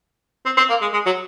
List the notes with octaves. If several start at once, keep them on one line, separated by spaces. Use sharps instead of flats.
C4
C4
A#3
G#3
G#3
F#3